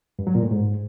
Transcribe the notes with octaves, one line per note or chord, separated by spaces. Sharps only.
G2
F#3
A#2
A2
G#2